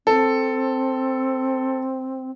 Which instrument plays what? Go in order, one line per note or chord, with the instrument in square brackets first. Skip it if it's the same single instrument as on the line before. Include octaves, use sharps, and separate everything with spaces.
[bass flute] C4 [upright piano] A4